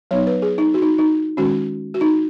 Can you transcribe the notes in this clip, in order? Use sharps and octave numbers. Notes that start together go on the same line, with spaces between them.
F#3 B3 D#4 C#5
B4
G#4
D#4
F#4
D#4
D#4
D#3 G#3 C#4 F#4
F#4
D#4